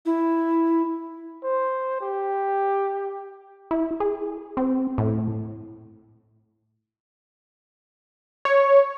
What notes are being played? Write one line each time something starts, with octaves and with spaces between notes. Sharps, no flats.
E4
C5
G4
E4
G#4
C4
A2
C#5